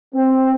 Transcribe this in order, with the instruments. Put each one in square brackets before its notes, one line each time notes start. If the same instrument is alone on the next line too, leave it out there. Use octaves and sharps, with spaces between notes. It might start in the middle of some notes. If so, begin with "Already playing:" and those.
[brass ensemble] C4